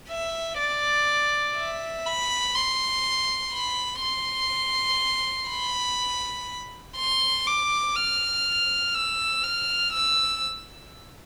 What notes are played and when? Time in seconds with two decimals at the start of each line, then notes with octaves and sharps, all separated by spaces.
0.09 E5
0.58 D5
1.56 E5
2.06 B5
2.55 C6
3.53 B5
4.02 C6
5.50 B5
6.97 C6
7.47 D6
7.96 F6
8.95 E6
9.43 F6
9.93 E6